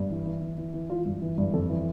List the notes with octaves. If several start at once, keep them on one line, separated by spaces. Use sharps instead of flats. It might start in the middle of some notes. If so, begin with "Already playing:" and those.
Already playing: G2
E3
E3
E3
E3
E3
E3 F4
G2
E3
G2
F2 A4
E3